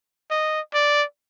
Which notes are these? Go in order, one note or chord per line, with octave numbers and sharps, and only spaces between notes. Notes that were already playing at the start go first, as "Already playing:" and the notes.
D#5
D5